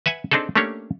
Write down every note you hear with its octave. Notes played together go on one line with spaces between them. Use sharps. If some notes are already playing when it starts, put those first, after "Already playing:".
B4 E5 F#5 G#5
C4 D4 D#4 G#4 A4
A3 A#3 C#4 D4 G4 C#5